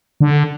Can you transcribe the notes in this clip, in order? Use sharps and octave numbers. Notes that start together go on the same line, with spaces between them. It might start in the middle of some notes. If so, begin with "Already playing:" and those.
D3